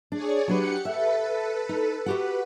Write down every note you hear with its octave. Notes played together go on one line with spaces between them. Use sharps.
D4 G#4 C#5 D5
F#3 D4 G4 B4 F#5 C#7
A4 B4 E5
D#4
F#4 G4 B4 F#5